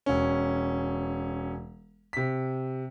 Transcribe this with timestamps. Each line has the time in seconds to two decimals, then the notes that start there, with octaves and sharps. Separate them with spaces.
0.06 E1 C#4
2.13 C3 B6